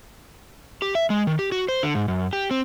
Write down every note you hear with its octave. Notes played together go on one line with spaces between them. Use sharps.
G4
E5
G#3
D#3
G4
F#4
C5
D3
G#2
F#2
G4
C4